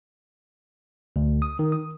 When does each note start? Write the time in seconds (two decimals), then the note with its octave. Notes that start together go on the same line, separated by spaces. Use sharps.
1.16 D2
1.42 D#6
1.59 D#3
1.72 D#6